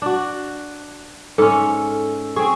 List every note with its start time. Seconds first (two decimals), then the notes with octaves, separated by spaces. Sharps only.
0.02 D4 F#4
1.38 G#2 C#4 A4
2.36 C4 G#4 C#6